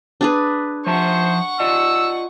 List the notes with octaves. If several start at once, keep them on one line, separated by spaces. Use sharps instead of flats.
D4 G#4 B4
F3 C5 E5 F#5 A5 C#6
F4 D5 D#5 E6